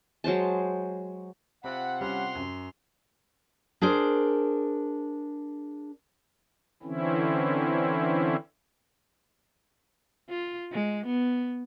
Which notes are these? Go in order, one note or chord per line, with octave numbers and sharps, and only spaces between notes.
F#3 G#3 C5 A5
C3 C4 F4 F#5 B5
G3 C#4 C6 F7
F#2
D4 G#4 A#4 C5
D3 E3 C4 C#4 E4
F4
G#3
B3